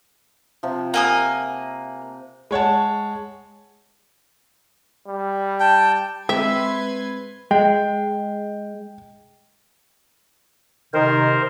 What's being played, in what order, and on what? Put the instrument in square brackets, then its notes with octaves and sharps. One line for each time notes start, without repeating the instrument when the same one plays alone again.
[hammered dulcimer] C3 F3
[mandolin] A#3 G#5 D#6 [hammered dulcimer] F#5
[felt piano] G#3 C#5 F#5 A5
[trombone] G3
[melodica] G5 [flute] A5
[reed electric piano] G#3 C4 [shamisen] G4 [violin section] B4 C6 G#6 [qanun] E5
[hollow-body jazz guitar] G#3 [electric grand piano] G5
[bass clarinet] C3 [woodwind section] D#3 [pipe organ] A#4 C5